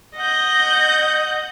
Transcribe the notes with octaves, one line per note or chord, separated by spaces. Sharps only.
D#5 F#5 G6